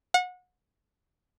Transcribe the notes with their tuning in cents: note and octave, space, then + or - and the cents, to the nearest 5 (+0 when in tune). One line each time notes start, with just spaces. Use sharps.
F#5 -30